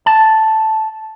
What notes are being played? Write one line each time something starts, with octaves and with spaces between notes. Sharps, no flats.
A5